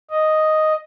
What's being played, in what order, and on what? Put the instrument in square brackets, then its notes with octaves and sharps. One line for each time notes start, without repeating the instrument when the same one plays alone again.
[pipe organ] D#5